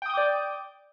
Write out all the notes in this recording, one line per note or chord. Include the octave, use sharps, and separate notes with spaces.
D5 G5 D6 D#6 G6